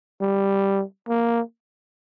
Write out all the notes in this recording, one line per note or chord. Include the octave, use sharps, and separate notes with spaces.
G3
A#3